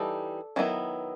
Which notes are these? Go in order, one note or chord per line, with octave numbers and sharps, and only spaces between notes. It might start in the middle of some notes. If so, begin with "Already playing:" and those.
Already playing: E3 G3 D#4 A4
D#3 F#3 B3 E4